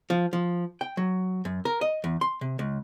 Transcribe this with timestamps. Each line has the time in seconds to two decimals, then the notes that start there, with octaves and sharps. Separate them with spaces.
0.10 F3
0.33 F3
0.81 G5
0.97 F#3
1.45 F#2
1.65 A#4
1.81 D#5
2.04 E2
2.21 C6
2.41 C3
2.59 C#2